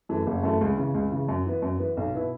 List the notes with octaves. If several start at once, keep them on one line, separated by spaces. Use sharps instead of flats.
F#2 E3 A3
F#1
F#2 E3 A3
C#2
C#3 E3
C#2
C#3 E3
F#2
E3 B3
F#2
E3 B3
B1
B2 B3 E4